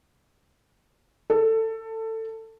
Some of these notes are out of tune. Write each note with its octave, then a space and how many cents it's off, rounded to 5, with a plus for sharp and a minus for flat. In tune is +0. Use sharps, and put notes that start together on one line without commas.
A4 +20